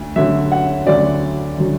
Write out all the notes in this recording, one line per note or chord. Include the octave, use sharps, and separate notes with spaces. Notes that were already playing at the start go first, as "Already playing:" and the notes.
Already playing: D2 D3
D2 D3 F#3 E5
F#5
D2 D3 F#3 D5
D3 F#3